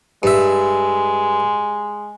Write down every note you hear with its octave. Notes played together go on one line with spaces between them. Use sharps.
G2 G#3 E5